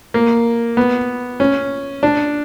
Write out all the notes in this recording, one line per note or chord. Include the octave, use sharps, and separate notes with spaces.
A#3
B3
C#4
D4